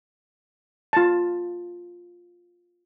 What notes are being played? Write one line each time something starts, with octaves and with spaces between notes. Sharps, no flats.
F4 A5